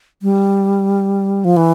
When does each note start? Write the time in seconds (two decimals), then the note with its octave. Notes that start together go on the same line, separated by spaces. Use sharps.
0.22 G3
1.45 F3
1.57 E3